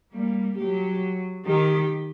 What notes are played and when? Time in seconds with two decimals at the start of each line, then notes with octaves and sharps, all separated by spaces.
0.14 G3 A#3
0.58 F#3 G4
1.45 D#3 G4